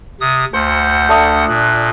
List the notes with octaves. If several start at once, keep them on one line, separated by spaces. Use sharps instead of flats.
C3 D#6
D2 C5 F#5 G6
A3 D4 D#6
A#2 F#6